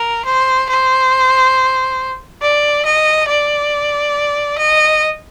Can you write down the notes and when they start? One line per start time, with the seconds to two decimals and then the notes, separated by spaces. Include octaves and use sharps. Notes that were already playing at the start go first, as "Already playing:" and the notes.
Already playing: A#4
0.25 C5
0.69 C5
2.42 D5
2.85 D#5
3.28 D5
4.58 D#5